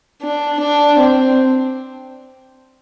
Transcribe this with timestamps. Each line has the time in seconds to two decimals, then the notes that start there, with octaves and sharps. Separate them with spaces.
0.22 D4
0.61 D4
0.99 C4